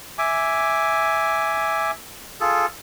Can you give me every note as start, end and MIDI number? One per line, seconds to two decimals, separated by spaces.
0.18 1.91 76
0.18 1.91 80
0.18 1.91 86
2.40 2.66 65
2.40 2.66 68
2.40 2.66 69